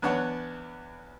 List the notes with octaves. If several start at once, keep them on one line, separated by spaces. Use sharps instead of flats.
E2 B3 D4 C#5 F#5